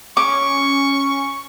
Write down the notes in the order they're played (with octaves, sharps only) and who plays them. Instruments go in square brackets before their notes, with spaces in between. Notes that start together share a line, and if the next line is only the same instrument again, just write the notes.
[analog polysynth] C#4 [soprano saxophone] C#6 [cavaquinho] D6